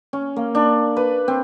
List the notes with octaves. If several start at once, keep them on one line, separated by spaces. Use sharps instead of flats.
C#4
A#3
D4
B4
C4